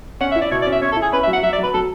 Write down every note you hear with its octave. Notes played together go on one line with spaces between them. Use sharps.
C#4 F#5
E5
E4
D5
B2 C#5
D5
C#4
E5
C#4 C#5
A4
E4
G#4
C#4 B4
E5
F#3
F#5
F#3 E5
D5
F#3 B4
F#3 A4